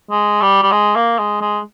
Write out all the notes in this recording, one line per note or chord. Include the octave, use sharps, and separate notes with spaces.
G#3
G3
G3
G#3
A#3
G#3
G#3